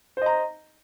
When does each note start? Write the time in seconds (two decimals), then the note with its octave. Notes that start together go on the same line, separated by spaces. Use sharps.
0.17 C5
0.22 D#5
0.26 A#5